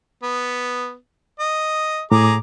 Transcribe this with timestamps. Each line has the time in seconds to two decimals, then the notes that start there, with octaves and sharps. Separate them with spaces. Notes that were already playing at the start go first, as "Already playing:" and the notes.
0.23 B3
1.40 D#5
2.12 A2 G#4 A#5 D6